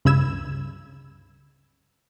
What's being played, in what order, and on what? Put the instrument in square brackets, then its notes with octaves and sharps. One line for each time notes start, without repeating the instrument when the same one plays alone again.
[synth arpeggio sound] C#2 G2 B5 E6 G#6 E7